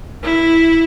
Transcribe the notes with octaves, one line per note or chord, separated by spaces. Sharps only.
E4